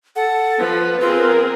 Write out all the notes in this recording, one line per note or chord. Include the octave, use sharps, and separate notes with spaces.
A4 F#5
F3 B4
C4 F4 G#4 A#4